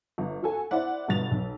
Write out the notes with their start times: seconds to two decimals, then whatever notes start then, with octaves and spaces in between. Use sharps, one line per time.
0.18 G1
0.43 F#4 A4 G#5
0.71 E4 C5 D5 F#5
1.08 G1 G2 B2 A6 F7
1.31 B1